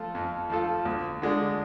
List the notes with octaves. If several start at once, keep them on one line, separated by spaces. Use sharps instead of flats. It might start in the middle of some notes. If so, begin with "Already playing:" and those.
Already playing: F3 A3 F4 A4
F2
F3 A3 F4 A4
D2
D3 G#3 D4